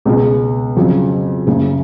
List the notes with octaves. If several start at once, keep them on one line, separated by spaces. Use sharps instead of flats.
C#2 B2 G#3
F2 C#3 F#3
F#1 F#2 C#3